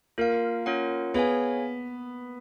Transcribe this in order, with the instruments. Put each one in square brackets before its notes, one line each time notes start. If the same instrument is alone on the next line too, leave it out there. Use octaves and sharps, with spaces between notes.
[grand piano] A#3 [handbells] F4 A#4 F5
[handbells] C#4 F4 A#4 C#5 F#5
[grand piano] B3 [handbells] G#4 C#5 F5 G#5